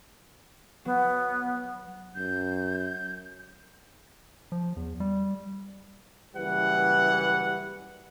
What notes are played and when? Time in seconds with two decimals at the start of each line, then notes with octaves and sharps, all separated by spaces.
0.85 F#3 B3
2.15 F#2 G6
4.52 F3
4.76 E2
5.00 G3
6.35 F#1 E3 G3 B4 F#5